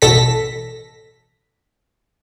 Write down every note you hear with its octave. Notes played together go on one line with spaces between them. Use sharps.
A1 B2 A4 A#6 B6